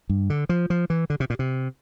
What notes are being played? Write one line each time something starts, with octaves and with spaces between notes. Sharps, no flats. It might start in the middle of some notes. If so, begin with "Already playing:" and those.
G2
D3
F3
F3
E3
D3
C3
A#2
C3